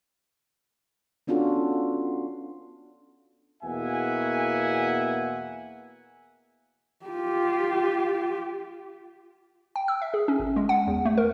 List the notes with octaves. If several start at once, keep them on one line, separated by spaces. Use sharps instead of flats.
B3 C#4 D4 F4 F#4 A4
E2 B2 A#3 E5 F#5 G#5
F4 G4
G5
E6
E5
G#4
C#4
G#1
G#3
F#5
E2
A3
A#4